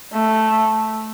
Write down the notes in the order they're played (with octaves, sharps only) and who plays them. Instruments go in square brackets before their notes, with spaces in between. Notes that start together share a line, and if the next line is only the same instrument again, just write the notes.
[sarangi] A3